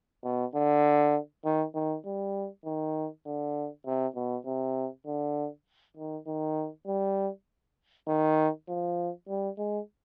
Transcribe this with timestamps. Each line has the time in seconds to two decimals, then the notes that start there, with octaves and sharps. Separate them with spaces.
0.24 B2
0.55 D3
1.45 D#3
1.75 D#3
2.05 G3
2.66 D#3
3.26 D3
3.86 C3
4.16 B2
4.46 C3
5.06 D3
5.97 D#3
6.27 D#3
6.87 G3
8.08 D#3
8.68 F3
9.28 G3
9.58 G#3